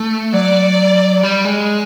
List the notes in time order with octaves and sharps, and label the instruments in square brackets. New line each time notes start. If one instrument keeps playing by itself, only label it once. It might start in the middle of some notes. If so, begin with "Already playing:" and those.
Already playing: [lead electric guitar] A3
[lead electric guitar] F#3 [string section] D5
[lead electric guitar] G3
G#3